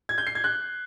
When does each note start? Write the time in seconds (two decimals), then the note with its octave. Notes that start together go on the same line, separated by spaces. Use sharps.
0.09 G#6
0.18 G6
0.27 C7
0.35 G#6
0.44 F#6